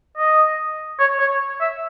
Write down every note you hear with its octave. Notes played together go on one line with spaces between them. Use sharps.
D#5
C#5
C#5
E5